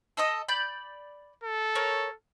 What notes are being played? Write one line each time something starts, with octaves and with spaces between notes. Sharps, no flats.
A4 D#5 D#6
D5 B5 G6
A4
A#4 C#5